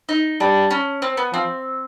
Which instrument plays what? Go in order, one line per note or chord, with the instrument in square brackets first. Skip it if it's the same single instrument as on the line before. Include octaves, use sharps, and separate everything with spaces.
[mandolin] D#4
[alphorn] G3 [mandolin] D4
[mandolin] C#4
C4
B3
[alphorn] F3 [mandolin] C4